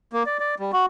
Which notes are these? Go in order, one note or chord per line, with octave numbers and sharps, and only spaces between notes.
A#3
D5
D5
G3
F#4